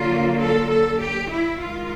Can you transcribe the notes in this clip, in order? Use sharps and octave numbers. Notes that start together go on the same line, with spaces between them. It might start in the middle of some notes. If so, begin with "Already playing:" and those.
Already playing: D3 F#3 A#3 F4
A4
A4
G4
E4
D#3 G#3 F4